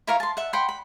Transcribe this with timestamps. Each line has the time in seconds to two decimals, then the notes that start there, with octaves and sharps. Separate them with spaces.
0.07 E4 A#4 F5 C#6
0.20 A5 C6
0.37 E5 F#5
0.53 F#5 G5 B5 C6
0.69 B5